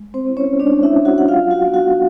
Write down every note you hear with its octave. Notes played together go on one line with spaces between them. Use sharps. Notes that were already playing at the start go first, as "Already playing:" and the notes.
Already playing: G#3
C4 C5
C4 E4
C#4 C#5
G#3 D4 D5
E4 E5
C4 E4
F#4 F#5
F#5
F#3 F4 F5
F#4 F#5
B3 D4 F4
F#4 F#5